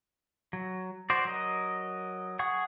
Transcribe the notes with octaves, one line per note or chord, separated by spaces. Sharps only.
F#3
F#4 C5 D5
F#3 A#4 D#5
G#4 F#5 C#6